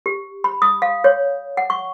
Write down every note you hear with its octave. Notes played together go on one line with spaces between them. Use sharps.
G4
B5
D#6
F5
C#5
F#5
C#6